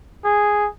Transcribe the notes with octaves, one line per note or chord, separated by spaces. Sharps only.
G#4